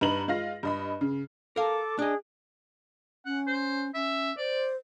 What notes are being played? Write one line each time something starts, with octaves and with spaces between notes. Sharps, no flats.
G2 D#4 B4 A#5 F#7
G#3 F4 F5 A#6
G2 D#5 B5
C#3
A4 A#4 F5 D6
D4 G#4 D#5
C#4 F#5
C5
C#4 E5
C5 D5